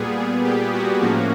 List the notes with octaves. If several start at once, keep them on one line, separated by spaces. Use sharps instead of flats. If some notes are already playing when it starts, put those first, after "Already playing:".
Already playing: A#2 G3 B3 G#4
G#4
G4
F#4
A2 F3 A#3 C#4